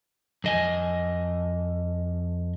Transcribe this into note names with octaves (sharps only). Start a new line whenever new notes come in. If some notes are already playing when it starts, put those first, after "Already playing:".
F2 D#5 G#5